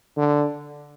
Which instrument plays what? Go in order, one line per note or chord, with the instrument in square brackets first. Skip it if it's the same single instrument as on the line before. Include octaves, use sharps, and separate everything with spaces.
[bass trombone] D3